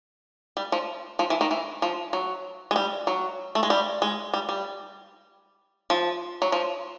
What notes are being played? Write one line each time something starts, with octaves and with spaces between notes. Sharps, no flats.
G3
F3
F3
E3
D#3
E3
F3
F#3
G#3
G3
F#3
A3
G#3
G3
G#3
G3
G3
F3
F#3
F3